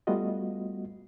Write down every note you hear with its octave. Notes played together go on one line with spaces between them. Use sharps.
G3 A3 B3 F4 F#4 D#5